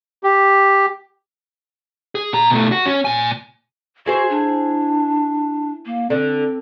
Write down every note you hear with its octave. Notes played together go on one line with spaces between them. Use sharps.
G4
G#4
A#2 A#5
B2 A3
F#4
C#4
A#2 G#5
E4 F#4 G#4 C5
D4
A#3
D3 C4